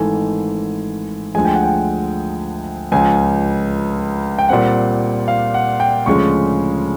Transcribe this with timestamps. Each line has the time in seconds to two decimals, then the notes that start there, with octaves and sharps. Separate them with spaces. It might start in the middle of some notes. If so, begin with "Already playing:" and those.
Already playing: G#1 G#2 E3 A3 G#5
1.35 D2 D3 F3 G#3 G#5
1.45 G5
1.54 F#5
1.63 G5
2.92 C#2 C#3 F3 G#5
4.38 G5
4.49 A#2 G3 C4 F#5
5.28 F5
5.54 F#5
5.80 G5
6.06 D2 C#3 F3 G#3 C#6